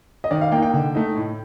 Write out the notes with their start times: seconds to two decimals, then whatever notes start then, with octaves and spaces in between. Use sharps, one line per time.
0.24 D#5
0.31 D#3 D5
0.41 F5
0.52 A#3 G5
0.57 D#4
0.62 G5
0.73 D3
0.95 A3 D#4
1.16 A2